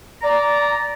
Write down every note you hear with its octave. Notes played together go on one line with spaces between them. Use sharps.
D5 A#5